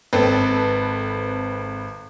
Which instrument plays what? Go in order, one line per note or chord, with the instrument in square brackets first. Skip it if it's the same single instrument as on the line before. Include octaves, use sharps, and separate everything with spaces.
[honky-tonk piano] G#1 C4 A4 B4